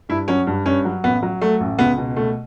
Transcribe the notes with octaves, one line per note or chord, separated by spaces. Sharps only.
G2 E4
F#3 C#4
G2
G2 C#4
F#3
A1 B3
F#3
F#3 A3
A1
C#2 B3
B2
B2 A3